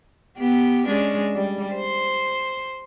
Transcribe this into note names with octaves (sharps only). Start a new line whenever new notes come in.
B3 G4
G#3 C#4 D4
G3
C5